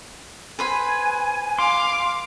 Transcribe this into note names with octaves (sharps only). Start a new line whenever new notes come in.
B4 C5 G#5 B5
F5 C6 D6